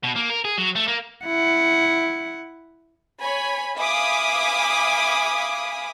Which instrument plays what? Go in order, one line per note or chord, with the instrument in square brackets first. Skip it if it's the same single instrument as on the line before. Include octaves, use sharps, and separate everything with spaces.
[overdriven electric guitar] B2
A#3
A#4
G#4
F#3
A3
A#3
[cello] E4 F#5
[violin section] C#5 G#5 B5
E5 F5 G#5 B5 D6 D#6